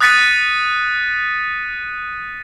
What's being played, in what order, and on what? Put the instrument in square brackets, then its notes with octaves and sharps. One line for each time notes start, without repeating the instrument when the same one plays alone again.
[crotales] D#6 F#6 A6 B6 C#7 D#7